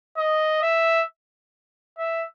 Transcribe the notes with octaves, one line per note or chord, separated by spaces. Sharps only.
D#5
E5
E5